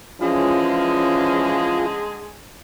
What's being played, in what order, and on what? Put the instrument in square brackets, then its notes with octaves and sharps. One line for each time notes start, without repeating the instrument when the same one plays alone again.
[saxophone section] D3 G#3 G#4 [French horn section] E3 F3 C#4 [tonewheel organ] F4